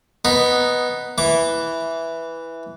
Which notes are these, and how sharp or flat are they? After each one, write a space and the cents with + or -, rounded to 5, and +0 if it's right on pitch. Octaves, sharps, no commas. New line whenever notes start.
B3 +0 D#4 +0
E3 +0 D6 -30